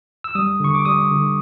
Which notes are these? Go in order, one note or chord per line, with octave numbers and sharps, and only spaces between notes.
E6
G3 D#6
D3 C#6
D6
G3 D#6
D3